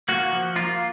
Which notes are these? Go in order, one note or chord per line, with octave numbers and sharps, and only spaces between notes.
A#3 F#4
F3
A#3 F4